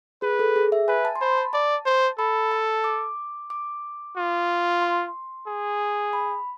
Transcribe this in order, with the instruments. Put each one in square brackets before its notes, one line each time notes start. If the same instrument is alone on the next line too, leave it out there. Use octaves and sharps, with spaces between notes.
[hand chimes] G#4 [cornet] B4
[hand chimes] A4
G#4
E5
[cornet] B4 [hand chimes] G#5
[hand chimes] A5
C6
[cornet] C5 [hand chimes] B5
[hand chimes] A5
[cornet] D5 [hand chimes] A5
[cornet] C5
[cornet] A4 [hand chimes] B5
[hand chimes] A5
D6
D6
[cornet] F4
[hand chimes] C6
[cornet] G#4
[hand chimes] B5